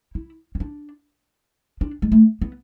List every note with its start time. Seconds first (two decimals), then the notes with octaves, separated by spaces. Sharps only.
0.15 E4
0.55 C#4
0.60 D4
1.81 D4
2.02 G#3
2.12 A3
2.42 B3